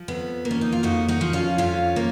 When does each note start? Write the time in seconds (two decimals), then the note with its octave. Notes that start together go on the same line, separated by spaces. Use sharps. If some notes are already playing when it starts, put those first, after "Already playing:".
Already playing: F3
0.08 F2 B3
0.45 A#3
0.51 C#4
0.61 D#4
0.72 F4
0.83 F2 D#4 F#4
1.08 D#4 F#4
1.21 F3
1.33 C#4 F4
1.58 F2 C#4 F4
1.96 A#3